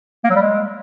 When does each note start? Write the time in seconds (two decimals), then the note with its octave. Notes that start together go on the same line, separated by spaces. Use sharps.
0.24 A#3
0.30 F#3
0.36 G3
0.41 G#3